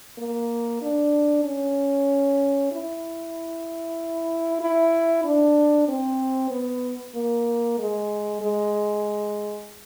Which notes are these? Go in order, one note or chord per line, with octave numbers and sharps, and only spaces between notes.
A#3
D4
C#4
E4
E4
D4
C4
B3
A#3
G#3
G#3